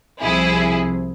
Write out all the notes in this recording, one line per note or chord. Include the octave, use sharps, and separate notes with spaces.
C2 C3 F3 E4 G#4